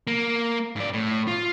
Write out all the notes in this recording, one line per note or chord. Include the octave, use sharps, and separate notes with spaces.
A#3
G#2 D5
A2
F4